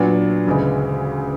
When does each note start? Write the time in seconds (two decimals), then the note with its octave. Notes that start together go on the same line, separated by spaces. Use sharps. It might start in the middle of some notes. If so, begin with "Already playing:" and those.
Already playing: A#2 F#3 B3 D4
0.47 D2 C#3 E3 G#3